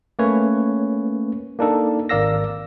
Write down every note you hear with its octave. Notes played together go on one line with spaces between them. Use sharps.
A3 A#3 C#4 B4 C#5
A#3 D4 D#4 A4
G#1 A#4 D5 F5 E6 A#6